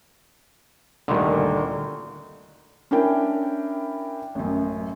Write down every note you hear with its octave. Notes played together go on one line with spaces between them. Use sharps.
D2 G2 A#2 D3 D#3
C#4 D4 E4 A#4 G5
A1 F#2